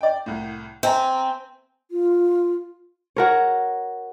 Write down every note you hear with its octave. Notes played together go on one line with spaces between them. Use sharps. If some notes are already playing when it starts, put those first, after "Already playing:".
D5 G5
C2 A2
C4 E5 G#5 A#5
F4
F#4 A#4 C#5